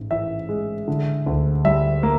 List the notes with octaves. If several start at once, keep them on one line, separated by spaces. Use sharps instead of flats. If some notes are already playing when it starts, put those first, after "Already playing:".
Already playing: A1 G#2
E3 E5
G#3
D3
D2
G3 E5
A#3